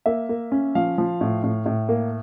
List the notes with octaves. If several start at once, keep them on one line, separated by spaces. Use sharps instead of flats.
A#3 E5
A#3
C#4
F3 F5
F3
A2
A2
A2
A#3